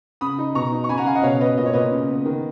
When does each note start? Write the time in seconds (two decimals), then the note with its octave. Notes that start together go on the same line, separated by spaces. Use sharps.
0.21 C#3 B5 D#6
0.38 D#4
0.55 B2 A#5 C#6
0.72 D#4
0.84 C#6
0.89 C#3 G#5 B5
0.98 F#5 A#5
1.06 C#3 F5 G#5
1.15 D#5 F#5
1.23 B2 C#5 F5
1.40 B2 B4 D#5
1.58 A#2 D#5
1.66 C#5
1.73 A#2 B4 D#5
1.92 C#3
2.08 B3
2.26 D#3